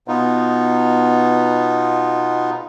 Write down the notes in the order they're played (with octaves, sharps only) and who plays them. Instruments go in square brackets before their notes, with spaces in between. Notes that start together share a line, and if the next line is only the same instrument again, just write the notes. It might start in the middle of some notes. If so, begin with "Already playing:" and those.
[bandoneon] B2 B3 D#4 F4